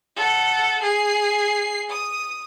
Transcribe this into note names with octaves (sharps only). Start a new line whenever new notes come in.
A4 F#5
G#4 C7
D#6